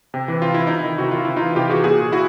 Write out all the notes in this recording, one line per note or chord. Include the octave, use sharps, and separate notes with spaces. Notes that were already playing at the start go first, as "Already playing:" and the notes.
C3
E3
C3 F4
E3 E4
C3 D#4
E4
D#3
C3 F#4
D#3 F4
C3 E4
D#4 F4
E3
C3 F4 G4
E3 F#4 G#4
A#2 F#4 G#4
E4 F#4